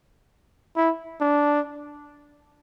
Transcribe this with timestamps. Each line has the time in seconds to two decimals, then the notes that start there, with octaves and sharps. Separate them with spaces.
0.76 E4
1.21 D4